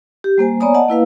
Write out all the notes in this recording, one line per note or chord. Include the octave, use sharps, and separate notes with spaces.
G4
G3 A#3 C5 G#5
B3 C#5 D5 G#5 A#5 D#6
D#5 F#5 A5
A#3 E4 B4 F5